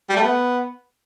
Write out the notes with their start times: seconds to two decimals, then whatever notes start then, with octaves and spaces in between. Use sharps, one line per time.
0.09 G3
0.16 A3
0.23 B3